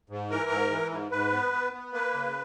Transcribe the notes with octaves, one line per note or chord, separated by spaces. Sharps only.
G#2
E3 A#4
G#2
E3
G#2
G#2 B4
B3
B3
B3
A#3 B4
C#3